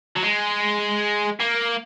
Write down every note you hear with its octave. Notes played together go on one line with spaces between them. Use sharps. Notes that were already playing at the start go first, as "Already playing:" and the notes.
F#3
G#3
A#3